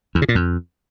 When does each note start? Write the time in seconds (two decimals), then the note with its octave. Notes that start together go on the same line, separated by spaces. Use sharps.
0.15 E2
0.22 C#3
0.29 A#2
0.35 F2